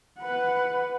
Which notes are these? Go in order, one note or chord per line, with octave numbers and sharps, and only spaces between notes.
B4 F#5